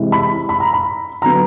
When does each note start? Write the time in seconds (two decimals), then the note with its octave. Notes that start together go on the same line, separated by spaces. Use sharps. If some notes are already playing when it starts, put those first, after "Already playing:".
Already playing: C3 E3 G#3
0.12 B5
0.49 B5
0.60 A#5
0.73 B5
1.22 D3 F#3 B3 A#5